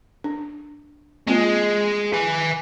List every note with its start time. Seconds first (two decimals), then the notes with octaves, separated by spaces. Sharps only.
0.24 D4
1.27 G#3 A#3 C4 F4
2.13 B4 G#5